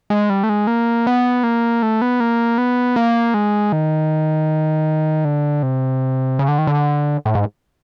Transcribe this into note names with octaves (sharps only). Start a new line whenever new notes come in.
G#3
G3
A3
G#3
A#3
B3
A#3
A3
B3
A#3
B3
A#3
G#3
D#3
D3
C3
C#3
D3
D#3
D3
A2
G#2